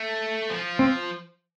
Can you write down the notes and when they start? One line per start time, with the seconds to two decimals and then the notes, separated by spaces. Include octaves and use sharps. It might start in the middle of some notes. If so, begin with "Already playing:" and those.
Already playing: A3
0.50 F3
0.79 C4